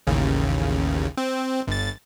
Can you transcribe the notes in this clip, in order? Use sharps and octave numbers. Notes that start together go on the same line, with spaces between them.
A1 D#2 C#3
C4
G1 A6